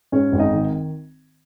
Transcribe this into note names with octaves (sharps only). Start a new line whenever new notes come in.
G#2 C#4 C#5
G#1
D#4 D#5
D#3